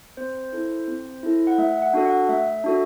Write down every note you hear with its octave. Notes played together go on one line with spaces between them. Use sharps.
C4 C5
E4 A4
C4
E4 A4
F#5
A3 E5
F#5
D4 F#4 A4
F#5
A3 E5
D4 F#4 A4